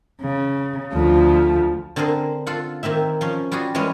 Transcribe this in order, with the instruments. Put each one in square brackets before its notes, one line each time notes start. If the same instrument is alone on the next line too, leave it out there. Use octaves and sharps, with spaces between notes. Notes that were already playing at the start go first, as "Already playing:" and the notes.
[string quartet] C#3
D2 F3
[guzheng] D3 C4 G#4 A#4 C5
F4 A4 F#5
D#3 A#3 C4 E5
F3 C#4
G3 F4 F#4 G#4
E3 G3 G#3 C#4